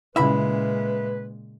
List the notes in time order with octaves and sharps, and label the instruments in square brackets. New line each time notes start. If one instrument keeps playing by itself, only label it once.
[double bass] A#2 G#3 [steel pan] C#3 E4 [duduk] B4 [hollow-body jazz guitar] E5 B5